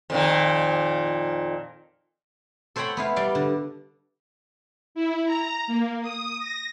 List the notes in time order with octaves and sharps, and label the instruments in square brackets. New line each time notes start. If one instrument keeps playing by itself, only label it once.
[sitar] F2 A#2 D#3
[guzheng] A4 C5 C#5 F#5 G5 B5
B3 E4 F5
G3 D5 F5
D3
[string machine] E4
A#5
A#3
D#6
A#6